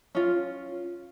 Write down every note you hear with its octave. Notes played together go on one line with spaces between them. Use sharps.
C#4 F4